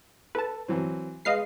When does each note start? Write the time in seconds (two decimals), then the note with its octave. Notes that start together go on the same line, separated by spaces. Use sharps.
0.35 A4 B4 A5
0.68 E3 F#3 C4
1.25 G#3 B4 D#5 F5 C7